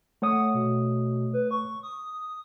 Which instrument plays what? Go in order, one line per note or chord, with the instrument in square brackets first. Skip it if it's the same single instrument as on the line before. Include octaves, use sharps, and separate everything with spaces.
[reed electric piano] A3 C#5 D#6 [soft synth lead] F#5
[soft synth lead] B2
B4
C#6
D#6